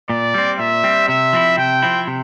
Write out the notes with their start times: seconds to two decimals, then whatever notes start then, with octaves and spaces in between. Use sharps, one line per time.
0.09 A#2 D5
0.34 G3 C4
0.59 A#2 E5
0.84 G3 C4
1.08 C3 E5
1.33 F3 C4 E4
1.57 C3 G5
1.83 F3 C4 E4
2.07 C3